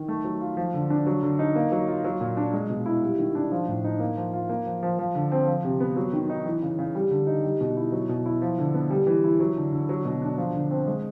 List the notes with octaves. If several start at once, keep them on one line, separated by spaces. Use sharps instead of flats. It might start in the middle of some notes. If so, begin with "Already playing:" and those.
Already playing: D#3
A3
F#3
F4
F3
D3
D4
F#3
D3
D#4
A#3
F#3
F4
F#3
A#2
D4
G#3
B2
E4
G3
D#3
D4
F3
A2
D#4
A#3
F3
F4
A#3
F3
F3
F3
D3
C4
F3
C3
B3
F#3
D#3
D#4
E3
C#3
C#3
G3
D3
D#4
G3
B2
E4
F#3
B2
E4
F3
D3
B3
G3
E3
E4
F#3
D3
D3
F#3
B2
D4
F3
D3
C4
G#3